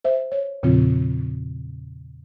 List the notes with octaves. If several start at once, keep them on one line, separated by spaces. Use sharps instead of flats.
C5 E5
C#5
E2 A#2 C#3 F3 C4 F4